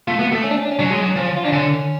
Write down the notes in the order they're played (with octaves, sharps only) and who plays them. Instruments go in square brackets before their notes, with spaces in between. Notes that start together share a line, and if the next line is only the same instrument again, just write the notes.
[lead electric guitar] A3 [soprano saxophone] F4
[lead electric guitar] B3 [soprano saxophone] F#4
[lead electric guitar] A3 [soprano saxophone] A4
[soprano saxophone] C#4
D4
C#4
D4
C#4
[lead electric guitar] F#3 [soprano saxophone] D4
[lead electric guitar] G#3 [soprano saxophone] C#4
[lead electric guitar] F#3
[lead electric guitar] F3 [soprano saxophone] C#4
[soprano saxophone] F4
D4
[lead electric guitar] D3 [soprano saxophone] C#4